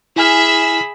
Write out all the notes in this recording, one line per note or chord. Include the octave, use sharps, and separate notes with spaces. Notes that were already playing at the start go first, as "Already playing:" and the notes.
E4 G#4 E5 G#5 B5 E6 F6